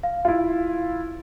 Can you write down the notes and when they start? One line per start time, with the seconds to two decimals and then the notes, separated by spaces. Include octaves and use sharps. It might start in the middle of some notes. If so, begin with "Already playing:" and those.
0.03 F5
0.25 E4 F4